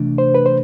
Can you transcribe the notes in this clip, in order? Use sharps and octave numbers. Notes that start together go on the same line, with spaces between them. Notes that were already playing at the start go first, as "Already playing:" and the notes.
Already playing: C3 E3 A3 D4
C5
B4
C5